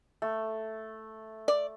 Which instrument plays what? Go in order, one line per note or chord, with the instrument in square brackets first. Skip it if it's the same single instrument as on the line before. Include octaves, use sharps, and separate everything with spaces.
[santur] A3
[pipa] D5